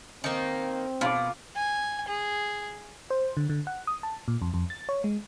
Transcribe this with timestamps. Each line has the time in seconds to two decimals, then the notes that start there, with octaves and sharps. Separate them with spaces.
0.24 D#3 A#3 C4
1.01 B2 F4 D6
1.56 G#5
2.08 G#4
3.10 C5
3.37 D3
3.49 D3
3.67 F#5
3.87 D#6
4.03 A5
4.28 A#2
4.42 F2
4.54 F2
4.70 A6
4.89 C#5
5.04 G#3